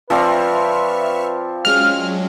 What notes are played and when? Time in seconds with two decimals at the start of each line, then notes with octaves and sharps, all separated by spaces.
0.10 F3 C4 B4 D5 E5 C#6 F6
1.65 F#3 G#3 C#4 F5 F6